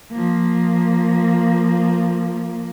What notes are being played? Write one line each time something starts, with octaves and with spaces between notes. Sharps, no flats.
F3 A#3